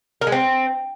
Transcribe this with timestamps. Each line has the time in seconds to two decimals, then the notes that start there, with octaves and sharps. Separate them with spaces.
0.21 A#4
0.27 G#3
0.32 C4